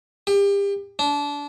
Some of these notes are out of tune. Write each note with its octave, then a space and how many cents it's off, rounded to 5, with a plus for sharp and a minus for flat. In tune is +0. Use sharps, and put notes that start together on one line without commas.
G4 +35
D4 -25